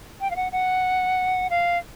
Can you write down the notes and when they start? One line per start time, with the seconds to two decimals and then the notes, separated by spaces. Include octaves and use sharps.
0.21 G5
0.31 F5
0.36 F#5
0.52 F#5
1.50 F5